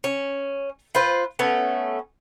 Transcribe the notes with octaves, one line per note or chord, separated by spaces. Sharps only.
C#4
F4 B4 C5
A3 B3 C#4